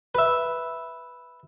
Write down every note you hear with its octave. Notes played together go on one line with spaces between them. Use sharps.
B4 E5